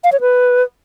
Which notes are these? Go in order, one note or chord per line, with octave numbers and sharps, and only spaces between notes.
F5
C#5
B4